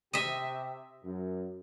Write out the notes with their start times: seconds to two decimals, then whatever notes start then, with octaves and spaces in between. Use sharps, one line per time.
0.13 C3 G4 D#5 E5
1.04 F#2